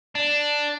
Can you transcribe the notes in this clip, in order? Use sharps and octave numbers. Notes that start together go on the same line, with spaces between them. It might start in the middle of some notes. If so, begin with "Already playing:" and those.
D4